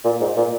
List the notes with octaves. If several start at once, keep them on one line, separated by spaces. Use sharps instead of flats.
A#2
G#2
A#2